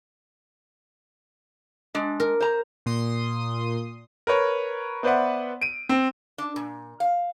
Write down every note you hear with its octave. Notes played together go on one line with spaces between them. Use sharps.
G#3 D4
A#4
C5 A#5
A#2 C6 D#6
A#4 B4 C#5
B3 B4 C5 D5 E5 F#5
D7 D#7
C4
D4
A#2
F5